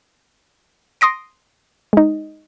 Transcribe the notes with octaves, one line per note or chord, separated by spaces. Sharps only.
C6 D#6 A#6 D7
G#3 D#4